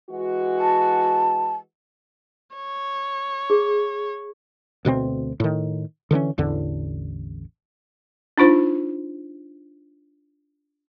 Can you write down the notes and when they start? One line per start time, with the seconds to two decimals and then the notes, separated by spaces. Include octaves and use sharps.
0.10 E3 G#3 F#4
0.60 A5
2.56 C#5
3.50 G#4
4.85 D2 B2 A#3 C4
5.40 A2 D#3
6.11 D3 E3 G#3 C#4
6.38 A1 E2 D3
8.38 D4 D#4 F4 C5